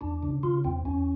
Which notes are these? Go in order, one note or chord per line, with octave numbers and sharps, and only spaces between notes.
E2 D4
C#3
C#3 F4
E2 C4
E2 C#4